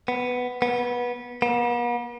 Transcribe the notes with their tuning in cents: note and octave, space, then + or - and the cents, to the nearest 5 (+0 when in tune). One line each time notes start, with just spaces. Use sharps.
B3 +5
B3 -20
B3 -45